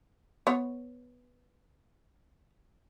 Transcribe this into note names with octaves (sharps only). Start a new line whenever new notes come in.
B3 C#5